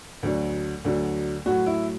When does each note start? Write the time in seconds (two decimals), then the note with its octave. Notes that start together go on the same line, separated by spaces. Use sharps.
0.23 D2 D3 F#3
0.84 D2 D3 F#3
1.46 A2 F#3 F#4
1.66 E4